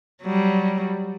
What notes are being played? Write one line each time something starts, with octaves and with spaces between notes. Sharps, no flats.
F#3 G3